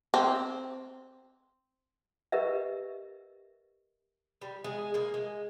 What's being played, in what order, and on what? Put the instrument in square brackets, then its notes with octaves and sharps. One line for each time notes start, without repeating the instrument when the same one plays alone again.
[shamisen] C4
[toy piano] G4 A#4 B4 D#5 E5
[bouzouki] G3
G#3 G#4
A#3 G#4
G#3